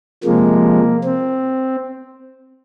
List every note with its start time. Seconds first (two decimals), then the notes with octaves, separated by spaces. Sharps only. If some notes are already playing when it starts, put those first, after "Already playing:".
0.24 C3 F3 G#3 A#3
1.04 C4